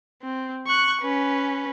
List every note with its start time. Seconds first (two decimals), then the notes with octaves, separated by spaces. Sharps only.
0.22 C4
0.67 C#6 F#6
1.02 C#4 B4